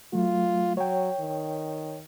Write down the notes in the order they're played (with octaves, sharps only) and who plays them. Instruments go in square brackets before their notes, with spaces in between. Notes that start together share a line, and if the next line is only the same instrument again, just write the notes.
[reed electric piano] F#3 A3 [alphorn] F4
[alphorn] F#3 [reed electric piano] C#5 G5
[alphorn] D#3